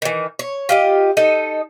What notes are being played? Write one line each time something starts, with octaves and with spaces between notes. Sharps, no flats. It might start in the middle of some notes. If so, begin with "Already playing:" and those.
D#3 E3
C#5
F4 G4 D#5
D#4 A4 D#5